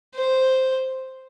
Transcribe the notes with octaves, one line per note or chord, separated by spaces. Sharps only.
C5